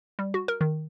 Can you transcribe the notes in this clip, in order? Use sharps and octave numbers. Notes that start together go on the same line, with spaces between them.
G3
F#4
A#4
D#3